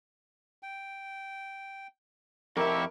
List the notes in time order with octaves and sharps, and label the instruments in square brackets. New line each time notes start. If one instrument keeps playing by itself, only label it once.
[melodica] G5
[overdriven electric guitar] F2 E5 [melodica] E4 G4 C#6 [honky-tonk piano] A#4